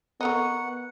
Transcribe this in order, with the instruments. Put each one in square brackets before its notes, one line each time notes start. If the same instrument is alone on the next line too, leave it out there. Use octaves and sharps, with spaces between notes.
[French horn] B3 [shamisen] A4 A#4 D#5 [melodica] F#5 [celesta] A#5 C#6